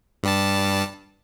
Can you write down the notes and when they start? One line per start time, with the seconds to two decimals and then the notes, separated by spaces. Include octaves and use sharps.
0.23 G2 G3 A5